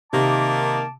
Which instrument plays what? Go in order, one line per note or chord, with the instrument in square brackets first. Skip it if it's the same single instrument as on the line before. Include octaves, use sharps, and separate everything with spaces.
[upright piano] C3 [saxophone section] D#3 A#3 [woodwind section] A5 D6